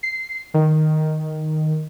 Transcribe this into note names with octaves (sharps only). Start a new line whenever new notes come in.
C7
D#3